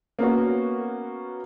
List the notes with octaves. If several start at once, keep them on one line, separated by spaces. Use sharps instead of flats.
A#3 B3 C#4 F#4